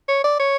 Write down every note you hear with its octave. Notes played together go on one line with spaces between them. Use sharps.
C#5
D5
C#5